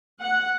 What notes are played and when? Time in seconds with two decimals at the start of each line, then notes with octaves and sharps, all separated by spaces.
0.19 F#5